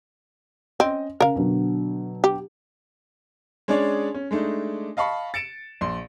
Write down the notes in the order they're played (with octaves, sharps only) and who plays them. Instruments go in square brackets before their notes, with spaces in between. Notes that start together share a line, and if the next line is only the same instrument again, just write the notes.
[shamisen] C4 [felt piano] C#4 D#5
[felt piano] C#3 [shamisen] A#4 F5
[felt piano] B2 D3 F#3
[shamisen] G4
[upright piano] G#3 C#4 D4 G#4 C#5 D5
C#4
G#3 A3 D4 D#4
D#5 F5 A5 B5 C#6
A6 C#7 D7 E7
A#1 C6